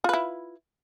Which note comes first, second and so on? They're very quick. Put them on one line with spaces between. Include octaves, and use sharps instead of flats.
F4 B4 E4